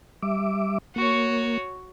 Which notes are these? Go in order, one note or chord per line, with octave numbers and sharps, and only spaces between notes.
G3 E5 D6
A#3 F#4 C#5